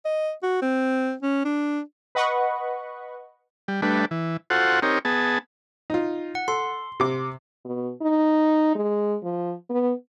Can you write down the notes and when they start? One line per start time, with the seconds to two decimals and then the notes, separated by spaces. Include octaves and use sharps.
0.05 D#5
0.43 F#4
0.62 C4
1.22 C#4
1.45 D4
2.15 B4 D#5 F#5 B5 C#6
3.68 G3
3.82 G3 A3 D4 B4
4.11 E3
4.50 F4 F#4 A4 C5 F#5
4.82 C4 D#4 G4 A#4 C#5
5.05 B3 G#4 A5
5.90 D#4 F4
6.35 F#5
6.48 A4 C6
7.00 C3 D6
7.65 B2
8.02 D#4
8.75 G#3
9.23 F3
9.70 B3